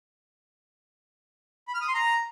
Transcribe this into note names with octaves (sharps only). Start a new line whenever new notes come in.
B5
F6
D#6
C6
A#5